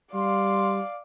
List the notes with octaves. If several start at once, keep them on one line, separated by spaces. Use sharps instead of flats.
G3 D5 F5 C6